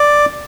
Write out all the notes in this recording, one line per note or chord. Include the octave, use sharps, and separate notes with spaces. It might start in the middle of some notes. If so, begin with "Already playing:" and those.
Already playing: D5